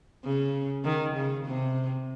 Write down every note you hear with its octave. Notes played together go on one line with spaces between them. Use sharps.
C#3
D#3
C#3
C3